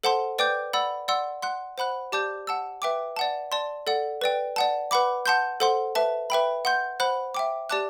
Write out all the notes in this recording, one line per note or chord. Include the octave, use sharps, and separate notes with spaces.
A4 C5 F#5 A5 C6
B4 D5 G5 D6 G6
D5 F#5 B5 E6
D5 F#5 C6 E6
F#5 C6 F#6
C5 F#5 B5 F#6
G4 D5 A5 D6 G6
F#5 A5 E6
B4 E5 G5 D6
D5 F#5 A5
D5 A5 C6
A4 D5 F#5
B4 D5 G5
D5 F#5 A5
B4 F#5 B5 D6
F#5 A5 C6 G6
A4 C5 F#5 C6
B4 E5 A5
B4 E5 G5 B5
F#5 C6 G6
C5 F#5 B5 F#6
E5 G5 D6
G4 D5 A5 D6 F#6